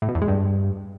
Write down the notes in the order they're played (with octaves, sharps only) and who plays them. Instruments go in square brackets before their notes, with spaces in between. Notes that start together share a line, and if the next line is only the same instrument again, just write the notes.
[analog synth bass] A2
B2
E2
G#3
G2